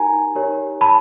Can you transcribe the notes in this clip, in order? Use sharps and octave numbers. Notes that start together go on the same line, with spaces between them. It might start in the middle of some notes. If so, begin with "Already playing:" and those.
Already playing: D#4 G4 A#4 G#5 A#5
D#4 G4 A#4 C#5
A5 B5